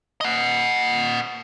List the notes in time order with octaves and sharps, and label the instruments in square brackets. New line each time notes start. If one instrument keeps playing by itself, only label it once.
[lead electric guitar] D#5 F#5